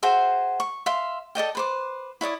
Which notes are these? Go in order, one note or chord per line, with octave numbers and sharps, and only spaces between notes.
F#4 G#4 C5 E5
C#6
E5 F5 C6
A4 D5 D#5 G5
B4 C5 D6
E4 C#5 D5 D#6